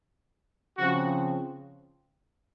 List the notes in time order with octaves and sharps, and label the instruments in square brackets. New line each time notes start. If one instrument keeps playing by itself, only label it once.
[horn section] C#3 F3 C4 F#4